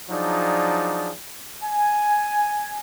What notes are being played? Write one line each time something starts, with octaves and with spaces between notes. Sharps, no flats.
F3 F#3 D4 D#4 G#4 D5
G#5